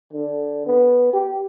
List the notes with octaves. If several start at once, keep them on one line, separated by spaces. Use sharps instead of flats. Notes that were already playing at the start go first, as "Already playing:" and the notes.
D3
B3
G4